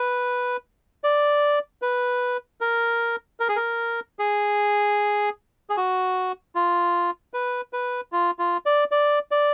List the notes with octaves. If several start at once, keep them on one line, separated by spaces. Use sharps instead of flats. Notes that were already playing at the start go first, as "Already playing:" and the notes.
Already playing: B4
D5
B4
A#4
A#4
G#4
A#4
G#4
G#4
F#4
F4
B4
B4
F4
F4
D5
D5
D5